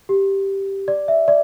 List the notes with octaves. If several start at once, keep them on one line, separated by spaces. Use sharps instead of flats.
G4
D5
E5
D5